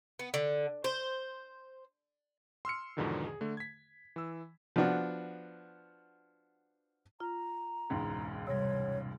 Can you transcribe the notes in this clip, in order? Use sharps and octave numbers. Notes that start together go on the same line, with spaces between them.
B3
D3
C5
C6 E6 F6 C#7
E2 G#2 B2 D3 D#3 F3
G#4
D3 A3
G#6 B6
E3 E6
F3 B3 D4 F#4
F4 A#5
E1 C#2 G#2
C3 G3 C#5